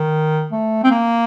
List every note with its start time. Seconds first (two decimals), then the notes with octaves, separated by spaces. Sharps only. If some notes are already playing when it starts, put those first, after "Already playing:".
Already playing: D#3
0.52 A3
0.84 C4
0.91 A#3